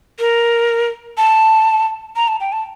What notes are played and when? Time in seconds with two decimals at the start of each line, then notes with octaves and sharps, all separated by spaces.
0.19 A#4
1.17 A5
2.16 A#5
2.28 A5
2.41 G5
2.52 A5